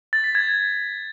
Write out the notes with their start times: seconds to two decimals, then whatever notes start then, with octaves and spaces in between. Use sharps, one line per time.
0.13 A6
0.24 B6
0.35 G#6